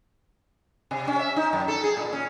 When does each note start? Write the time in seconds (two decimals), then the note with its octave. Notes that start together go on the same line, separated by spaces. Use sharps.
0.91 C3
1.07 C#4
1.19 E5
1.36 D#4
1.53 F#2
1.68 A4
1.84 G#4
1.97 A#2
2.13 C#4